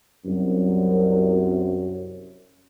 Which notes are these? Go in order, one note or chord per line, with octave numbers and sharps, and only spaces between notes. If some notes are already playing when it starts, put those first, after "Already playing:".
C2 F#2